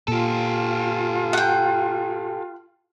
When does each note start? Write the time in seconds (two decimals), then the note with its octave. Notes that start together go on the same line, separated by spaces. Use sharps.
0.08 A#2 F4 G4 A4
1.33 F#5 G5